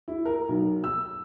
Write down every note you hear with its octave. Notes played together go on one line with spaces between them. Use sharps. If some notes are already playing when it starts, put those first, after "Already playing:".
E4
A#4
B1
E6